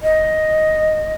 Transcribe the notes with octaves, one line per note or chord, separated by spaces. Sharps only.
D#5